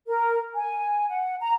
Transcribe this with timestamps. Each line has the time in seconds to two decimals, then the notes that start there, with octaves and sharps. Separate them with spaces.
0.07 A#4
0.55 G#5
1.09 F#5
1.40 A#5